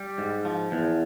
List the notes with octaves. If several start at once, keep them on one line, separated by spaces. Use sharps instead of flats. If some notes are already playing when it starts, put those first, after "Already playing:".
Already playing: G3
G#2
F3
E2